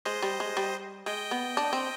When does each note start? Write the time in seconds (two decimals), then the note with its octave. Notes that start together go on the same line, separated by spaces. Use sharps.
0.05 G#3 C5 D#5
0.22 G3
0.40 G#3
0.57 G3
1.06 G#3 D#5 G5
1.31 B3
1.57 D4
1.73 C4